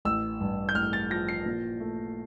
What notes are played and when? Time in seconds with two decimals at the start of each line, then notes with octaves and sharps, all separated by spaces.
0.05 A1 E6
0.40 G2
0.69 G6
0.75 A1 F6
0.93 A6
1.10 F3 A#6
1.29 C7
1.46 A#2
1.80 A3